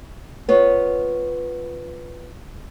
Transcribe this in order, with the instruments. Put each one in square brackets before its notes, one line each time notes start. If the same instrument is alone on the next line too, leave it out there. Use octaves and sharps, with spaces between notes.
[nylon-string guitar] B3 F4 C#5